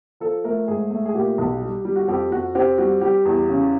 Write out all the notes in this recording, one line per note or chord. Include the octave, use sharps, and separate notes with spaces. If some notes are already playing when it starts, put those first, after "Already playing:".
F3 A4
A3 A#4
G#2 G#4
A3
G#4
A#2 G4
B1
G3
G3
F#4
F2 G4
F2 F#4
C4 G4
G3 F#4
G3 G4
E2
C#3